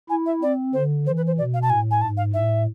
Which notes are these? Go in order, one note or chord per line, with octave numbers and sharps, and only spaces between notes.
E4 G#5
E5
C4 D5
D3 C5
E3 C5
B4
C5
B2 D5
F5
A5
A2 G#5
G#5
G#2 A5
F5
A2 E5